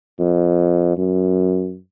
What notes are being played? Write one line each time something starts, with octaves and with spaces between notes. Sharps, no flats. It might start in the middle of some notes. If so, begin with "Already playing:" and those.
F2
F#2